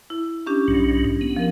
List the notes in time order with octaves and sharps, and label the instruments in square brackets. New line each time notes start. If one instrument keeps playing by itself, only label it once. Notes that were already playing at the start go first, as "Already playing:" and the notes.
[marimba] E4
C#4 D4 G4
[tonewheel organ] B1 G#2 F#3
B3
[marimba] F3 A#4